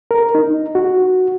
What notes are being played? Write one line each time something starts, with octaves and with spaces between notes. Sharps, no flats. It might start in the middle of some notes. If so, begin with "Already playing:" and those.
A#4
D#4
F#4